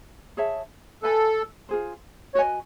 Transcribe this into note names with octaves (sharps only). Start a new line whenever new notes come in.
G#4 C#5 E5 A5
A4 B4 E5 G#5 B5
F4 G#4 C5
F#4 B4 C#5 D#5 G#5